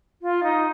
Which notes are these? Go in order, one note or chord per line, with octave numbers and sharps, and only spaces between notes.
F4
D#4